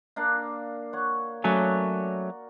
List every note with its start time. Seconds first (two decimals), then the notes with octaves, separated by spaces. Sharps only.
0.16 A#3 D4 F5
0.93 C#5 F#5
1.44 F#3 A3 C#4 F#4 A#4 D5